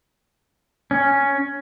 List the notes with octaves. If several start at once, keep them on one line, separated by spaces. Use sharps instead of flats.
C#4